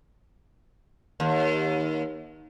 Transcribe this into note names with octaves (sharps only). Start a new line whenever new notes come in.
D#2